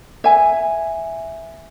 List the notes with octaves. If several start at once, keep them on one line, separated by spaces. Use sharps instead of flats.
E5 G#5